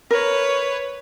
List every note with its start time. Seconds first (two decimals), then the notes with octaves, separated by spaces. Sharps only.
0.11 A#4 B4 C#5